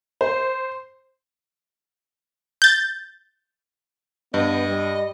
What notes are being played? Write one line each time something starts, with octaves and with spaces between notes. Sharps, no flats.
C5
G6 A6
G2 B3 D#5
G3